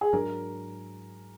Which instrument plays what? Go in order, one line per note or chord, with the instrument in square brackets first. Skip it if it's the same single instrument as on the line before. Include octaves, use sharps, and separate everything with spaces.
[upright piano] G#4
[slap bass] G#2 F#3 D4 [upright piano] A#4